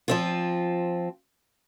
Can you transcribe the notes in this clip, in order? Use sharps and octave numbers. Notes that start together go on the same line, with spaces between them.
F3 C4 F4